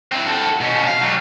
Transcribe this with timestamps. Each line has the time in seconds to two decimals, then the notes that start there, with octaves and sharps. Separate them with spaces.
0.12 C4 E4
0.26 F#4 A4
0.61 B2 C#4
0.87 F5
1.01 F#3 G3